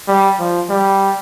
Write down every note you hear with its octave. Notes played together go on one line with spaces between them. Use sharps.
G3
F3
G3